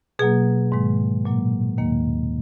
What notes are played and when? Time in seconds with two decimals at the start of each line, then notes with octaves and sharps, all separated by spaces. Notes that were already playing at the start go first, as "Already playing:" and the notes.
0.19 B2 F#3 A#3 G#4
0.72 G#2 D#3 G#3
1.25 A#2 F#3 A#3
1.78 D#2 D#3 A#3